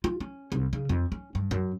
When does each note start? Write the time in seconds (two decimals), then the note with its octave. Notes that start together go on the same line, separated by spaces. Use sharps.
0.04 F4
0.20 C#4
0.52 C2
0.73 C#3
0.89 F2
1.12 C#4
1.35 G2
1.51 F#2